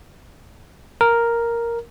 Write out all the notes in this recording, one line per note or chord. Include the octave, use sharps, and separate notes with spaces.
A#4